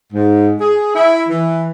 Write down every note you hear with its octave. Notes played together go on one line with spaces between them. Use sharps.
G#2
G#4
E4
E3